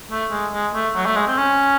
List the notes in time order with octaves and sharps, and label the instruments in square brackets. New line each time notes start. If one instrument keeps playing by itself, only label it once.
[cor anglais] A3
G#3
G#3
A3
F#3
A3
G#3
C4
C#4